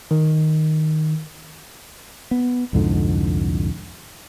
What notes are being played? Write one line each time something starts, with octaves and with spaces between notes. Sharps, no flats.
D#3
B3
C2 F2 G#2 D3